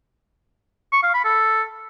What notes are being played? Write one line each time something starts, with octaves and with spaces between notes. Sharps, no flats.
C#6
F5
B5
A4